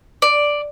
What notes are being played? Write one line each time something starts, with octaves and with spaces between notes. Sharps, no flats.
D5